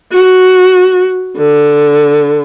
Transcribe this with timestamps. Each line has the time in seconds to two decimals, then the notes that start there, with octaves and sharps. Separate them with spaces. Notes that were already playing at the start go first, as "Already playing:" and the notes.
0.12 F#4
1.37 D3